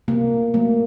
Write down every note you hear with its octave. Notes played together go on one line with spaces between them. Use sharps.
C3 A#3
F#3 A3 A#3